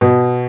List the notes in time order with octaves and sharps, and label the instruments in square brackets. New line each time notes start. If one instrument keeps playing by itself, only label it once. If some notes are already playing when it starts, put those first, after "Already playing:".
[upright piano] B2